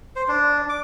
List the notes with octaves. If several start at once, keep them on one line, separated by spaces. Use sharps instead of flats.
C5
D4
D6